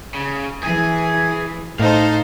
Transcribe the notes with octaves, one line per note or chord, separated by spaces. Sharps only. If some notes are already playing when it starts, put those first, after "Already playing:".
C#3
E3 G#4 G#5
A2 D#4 A4 C5 F5